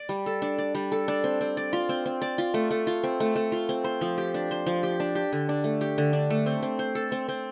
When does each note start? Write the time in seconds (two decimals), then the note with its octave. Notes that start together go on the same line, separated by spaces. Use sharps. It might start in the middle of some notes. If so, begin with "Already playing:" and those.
Already playing: D5
0.09 G3
0.26 A4
0.42 D4
0.58 D5
0.75 G3
0.92 A4
1.08 D4
1.24 C4
1.41 C4
1.57 D5
1.73 F4
1.89 C4
2.06 C4
2.22 D5
2.38 F4
2.54 A3
2.70 A3
2.87 F4
3.03 C4
3.20 A3
3.35 A3
3.52 F4
3.69 C4
3.84 C5
4.01 F3
4.18 G4
4.34 D4
4.51 C5
4.66 F3
4.83 G4
5.00 D4
5.15 G4
5.32 D3
5.49 D4
5.64 A3
5.81 G4
5.98 D3
6.13 D4
6.30 A3
6.46 C4
6.63 C4
6.79 C5
6.95 A4
7.12 C4
7.28 C4